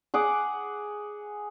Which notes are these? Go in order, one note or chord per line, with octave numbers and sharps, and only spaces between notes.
G#4 F#5 D6